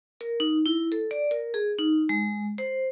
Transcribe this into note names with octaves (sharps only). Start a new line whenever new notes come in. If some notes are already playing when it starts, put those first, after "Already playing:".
A#4
D#4
E4
A4
D5
A#4
G#4
D#4
G#3
C5